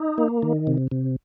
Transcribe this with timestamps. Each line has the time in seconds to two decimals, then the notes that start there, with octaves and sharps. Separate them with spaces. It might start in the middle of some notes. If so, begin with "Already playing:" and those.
Already playing: D#4
0.18 A#3
0.43 D#3
0.67 C3
0.91 C3